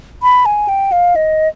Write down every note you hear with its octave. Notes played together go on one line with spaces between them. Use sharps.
B5
G#5
G5
F5
D#5